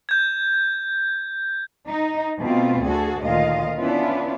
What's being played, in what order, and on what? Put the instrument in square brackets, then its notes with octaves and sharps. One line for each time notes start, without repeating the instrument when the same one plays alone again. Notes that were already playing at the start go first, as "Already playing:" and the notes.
[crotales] G6 G#6
[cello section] D#4
B2 A3 C4 F4
D2 F#4 G#4 A4
D2 A#2 D#3 F4 D#5 F5
B3 C#4 D4 E4 F4 B4